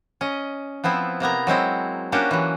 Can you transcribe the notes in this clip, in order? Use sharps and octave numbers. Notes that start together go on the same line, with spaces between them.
C#4 D#5
F3 B3 C4 E4
C3 A#3 B3 A#5
F#3 G#3 C4 E4
A#3 C#4 D4 F#4 G4
E3 F#3